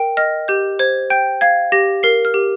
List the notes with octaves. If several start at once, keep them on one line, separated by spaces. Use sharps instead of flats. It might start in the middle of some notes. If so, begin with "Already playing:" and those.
Already playing: A#4 G5
D#5 F6
G4 G6
C5 G#6
G5 G6
F5 G#6
G4 A#6
A#4 C7
F6
G4